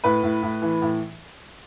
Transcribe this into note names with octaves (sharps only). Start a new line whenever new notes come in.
A2 B4
A2
A2
E3
A2